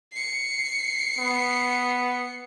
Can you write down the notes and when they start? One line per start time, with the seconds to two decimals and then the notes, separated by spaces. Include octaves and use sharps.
0.12 C7 C#7
1.18 B3